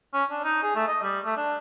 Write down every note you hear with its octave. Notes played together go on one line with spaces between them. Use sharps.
C#4
D4
D#4
G#4
A3
D#5
G3
A3
D4